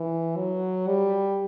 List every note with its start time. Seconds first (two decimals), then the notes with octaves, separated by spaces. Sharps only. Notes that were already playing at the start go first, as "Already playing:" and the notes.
Already playing: E3
0.36 F#3
0.87 G3